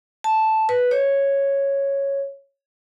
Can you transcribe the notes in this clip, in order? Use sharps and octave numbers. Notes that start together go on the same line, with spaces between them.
A5
B4
C#5